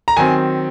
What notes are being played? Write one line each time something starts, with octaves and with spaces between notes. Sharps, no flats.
A#5
D#3 F#3 C4 G#5